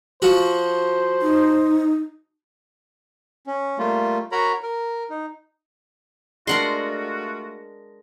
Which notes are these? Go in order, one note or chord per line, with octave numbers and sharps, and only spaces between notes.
F3 F#4 C5
D#4
C#4
G3 A3 A#3 F4
F#4 A#4 C#5 A#5 B5
A#4
D#4
G#3 A3 D4 F4 F#4 A#4 F#5 C6